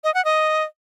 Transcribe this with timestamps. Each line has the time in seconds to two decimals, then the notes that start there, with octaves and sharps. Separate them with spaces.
0.04 D#5
0.14 F#5
0.25 D#5